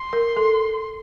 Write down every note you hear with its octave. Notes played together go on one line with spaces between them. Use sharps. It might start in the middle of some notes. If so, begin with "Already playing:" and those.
Already playing: C6
A#4
A4